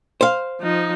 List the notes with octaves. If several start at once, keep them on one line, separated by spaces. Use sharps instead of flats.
C5 F5
F3 D#4